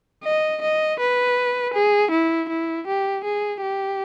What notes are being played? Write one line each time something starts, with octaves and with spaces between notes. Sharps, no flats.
D#5
D#5
B4
G#4
E4
E4
G4
G#4
G4